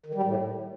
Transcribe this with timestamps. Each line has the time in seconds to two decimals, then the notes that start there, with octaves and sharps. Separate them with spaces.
0.06 D#3
0.15 G3
0.23 A2